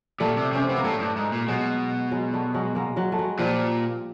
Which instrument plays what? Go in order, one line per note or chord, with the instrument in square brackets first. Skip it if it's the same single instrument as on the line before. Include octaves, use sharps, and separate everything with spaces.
[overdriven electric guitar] A#2 [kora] G3 A3
[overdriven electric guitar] C3
[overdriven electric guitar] C3 [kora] C#4
[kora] C4
[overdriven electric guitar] C3 [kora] B3
[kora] A#3
[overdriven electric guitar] A2 [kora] G3 A3
[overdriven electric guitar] G2
G#2
A#2
[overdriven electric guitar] B2 [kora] F#3 G#3
[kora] F#3 G#3
G3 A3
F#3 G#3
G#3 A#3
F#3 G#3
A3
F#3 G#3
[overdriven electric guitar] A#2 [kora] F3 G3